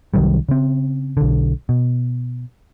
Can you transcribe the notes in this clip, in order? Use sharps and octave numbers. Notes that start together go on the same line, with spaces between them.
C2 D#3 F#3 G3
C#3 C4
B1 D3
B2